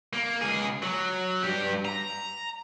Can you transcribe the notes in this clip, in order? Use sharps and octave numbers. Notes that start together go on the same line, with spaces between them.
A#3
C#2 G#4
F#3
G2 G4
A#5